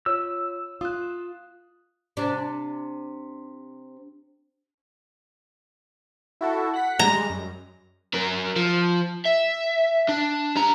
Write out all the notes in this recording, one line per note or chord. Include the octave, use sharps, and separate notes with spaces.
F4 C#5 E6
F4 D#6 F#6
C3 D4
E4 F#4 A4
F#5 B6
G3 G#3 A#5
F#2
F#3 A#4
F3
E5
D4
G3 A#5